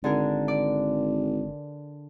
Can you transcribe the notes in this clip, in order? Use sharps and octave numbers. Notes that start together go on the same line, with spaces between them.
G#1 D3 G#4 A#4
D5